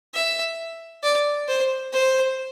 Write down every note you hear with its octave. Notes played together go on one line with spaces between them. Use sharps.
E5
D5
C5
C5